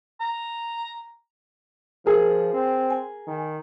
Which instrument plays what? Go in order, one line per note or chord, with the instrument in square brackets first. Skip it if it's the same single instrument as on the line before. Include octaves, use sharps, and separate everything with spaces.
[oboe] A#5
[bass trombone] F3 [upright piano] G#4 A#4
[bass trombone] C4
[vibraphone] G#5
[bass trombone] D#3